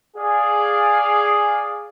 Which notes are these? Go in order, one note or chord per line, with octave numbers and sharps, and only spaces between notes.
G#4 D5 F5